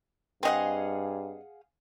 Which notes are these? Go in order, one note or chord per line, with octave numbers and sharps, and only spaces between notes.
G2 C4 G#4 D#5 F5 F#5